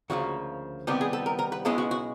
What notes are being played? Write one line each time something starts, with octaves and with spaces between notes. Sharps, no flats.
D2 C#3 F3 A#3 F#4
C2 C3 D#3 G3 B3 G4
G#4
A4
A#4
A#4
B4
B1 B2 G#3 C#4 E4 A4
F#4
F#4